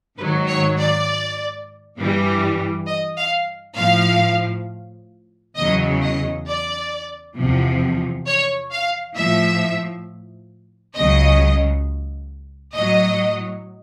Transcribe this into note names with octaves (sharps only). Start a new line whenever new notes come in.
G#2 D#3 F#3 B4
C#5
D5
G2 E3 G3
D#5
F5
A2 F3 F5
E2 C#3 F#3 D#5
D#5
D5
E2 C3 F3
C#5
F5
A2 F3 E5
C#2 C#3 F#3 D#5
A2 F#3 D#5